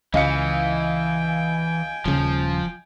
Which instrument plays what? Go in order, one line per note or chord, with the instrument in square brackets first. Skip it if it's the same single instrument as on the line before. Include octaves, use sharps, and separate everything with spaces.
[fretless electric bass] C#2 [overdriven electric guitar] E3 [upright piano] D#5 F5 C#7 [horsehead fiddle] G5 G#5
[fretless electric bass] D#1 C#3 [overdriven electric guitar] F3